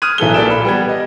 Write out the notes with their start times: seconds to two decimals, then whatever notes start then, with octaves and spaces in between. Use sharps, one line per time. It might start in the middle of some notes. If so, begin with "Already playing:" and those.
0.02 D#6 F6 F#6 G#6 D#7
0.18 B1 E3 A4 G7
0.34 A#2 A4 D5 D7 E7
0.50 B5
0.65 G3 B3 G#6
0.89 D#5